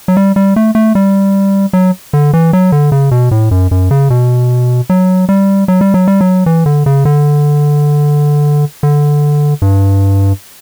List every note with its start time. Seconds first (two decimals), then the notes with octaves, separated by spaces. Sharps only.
0.08 F#3
0.17 G3
0.36 G3
0.56 A3
0.75 A3
0.95 G3
1.73 F#3
2.13 D3
2.33 E3
2.53 F#3
2.72 D3
2.92 C#3
3.11 B2
3.31 A2
3.51 F#2
3.71 F#2
3.91 C#3
4.10 B2
4.90 F#3
5.29 G3
5.68 F#3
5.81 G3
5.94 F#3
6.08 G3
6.21 F#3
6.46 E3
6.66 D3
6.86 C#3
7.05 D3
8.83 D3
9.62 G2